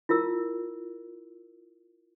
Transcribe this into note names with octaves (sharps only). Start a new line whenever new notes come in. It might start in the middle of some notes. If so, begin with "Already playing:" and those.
E4 F4 A#4 E6